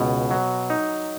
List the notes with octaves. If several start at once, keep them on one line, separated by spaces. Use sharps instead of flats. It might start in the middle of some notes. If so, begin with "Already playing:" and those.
Already playing: C#2 B2
F#3
D#4